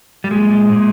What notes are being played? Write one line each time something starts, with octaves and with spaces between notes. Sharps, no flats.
G3
A#2 G#3
A#2